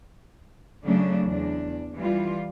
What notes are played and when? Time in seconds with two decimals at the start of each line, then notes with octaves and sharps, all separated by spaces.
0.85 C#3 F#3 A3 C#4 D4
1.25 E2 D4
1.96 E3 G3 F4